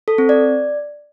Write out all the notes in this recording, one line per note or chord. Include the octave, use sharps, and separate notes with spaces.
A4
C4
D5